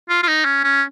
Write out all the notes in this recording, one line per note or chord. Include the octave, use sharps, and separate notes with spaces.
F4
F4
D#4
C#4
C#4